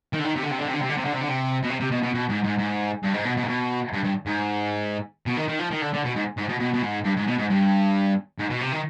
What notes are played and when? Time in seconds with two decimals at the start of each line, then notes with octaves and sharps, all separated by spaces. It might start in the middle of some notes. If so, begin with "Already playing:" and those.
0.13 D#3
0.19 D3
0.25 D#3
0.36 C3
0.43 D3
0.51 C3
0.59 D3
0.66 C3
0.74 D3
0.82 C3
0.90 D3
0.97 C3
1.05 D3
1.13 C3
1.21 D3
1.28 C3
1.63 B2
1.70 C3
1.80 C3
1.92 B2
2.03 B2
2.14 B2
2.29 G#2
2.44 G#2
2.59 G#2
3.03 G2
3.14 G#2
3.25 B2
3.37 B2
3.43 G#2
3.48 B2
3.93 G2
4.04 G2
4.26 G#2
5.26 B2
5.37 D#3
5.48 D#3
5.59 F3
5.71 D#3
5.82 D3
5.93 D3
6.05 B2
6.16 G#2
6.38 G#2
6.49 B2
6.60 B2
6.74 B2
6.82 G#2
7.04 G2
7.16 G#2
7.27 B2
7.38 G#2
7.49 G2
8.39 G#2
8.50 B2
8.61 C3
8.72 D#3